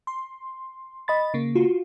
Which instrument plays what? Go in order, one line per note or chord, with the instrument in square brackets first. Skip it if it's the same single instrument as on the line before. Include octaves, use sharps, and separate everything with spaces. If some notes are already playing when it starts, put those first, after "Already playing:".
[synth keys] C6
[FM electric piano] D#5 B5 A6
C#3 A#3
[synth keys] F4 F#4